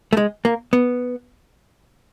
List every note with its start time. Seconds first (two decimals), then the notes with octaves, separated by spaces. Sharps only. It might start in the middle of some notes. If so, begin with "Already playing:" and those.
0.13 A3
0.17 G#3
0.45 A#3
0.73 B3